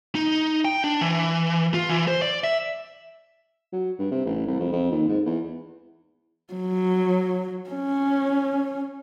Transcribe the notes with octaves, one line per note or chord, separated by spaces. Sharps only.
D#4
G5
D4
E3
F4
E3
C5
D5
E5
F#3
G2
C3
A1
C2
F2
F2
D#2
G#2
E2
F#3
C#4